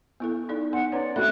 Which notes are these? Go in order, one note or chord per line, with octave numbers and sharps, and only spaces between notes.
B3 E4 A4
D#4 A4 D5
B3 F#5 C6
C#4 B4 C#5 D5
A3 C4 F#4 B5 F#6